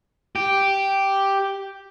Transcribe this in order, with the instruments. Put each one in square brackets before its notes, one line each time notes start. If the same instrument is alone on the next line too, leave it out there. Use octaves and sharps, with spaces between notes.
[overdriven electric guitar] G4